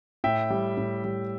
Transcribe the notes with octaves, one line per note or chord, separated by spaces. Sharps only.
A2 E5 G5
G3
A2
G3